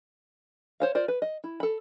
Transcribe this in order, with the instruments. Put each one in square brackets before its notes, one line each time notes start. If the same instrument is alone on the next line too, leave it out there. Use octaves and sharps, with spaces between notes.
[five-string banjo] C5 C#5 F5
F4 A#4 C5 D5
B4
D#5
E4
A4 B5